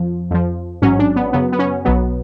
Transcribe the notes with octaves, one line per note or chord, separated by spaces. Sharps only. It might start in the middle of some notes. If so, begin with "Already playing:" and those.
Already playing: F2 F3
F2 F3
A1 G#2 F#3 C#4
D4
B3
F#2 C#3 F#3 B3
B3
C#4
B1 B2 F#3 B3